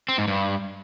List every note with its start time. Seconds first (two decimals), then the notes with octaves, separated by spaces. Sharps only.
0.09 C4
0.18 G#2
0.28 G2